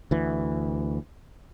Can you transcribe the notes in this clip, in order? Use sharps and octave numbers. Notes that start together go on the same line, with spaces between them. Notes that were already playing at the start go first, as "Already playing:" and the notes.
D2 E3